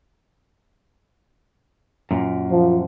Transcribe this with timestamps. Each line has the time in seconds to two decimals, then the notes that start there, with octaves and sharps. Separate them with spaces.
2.11 F#2 A#2
2.52 F3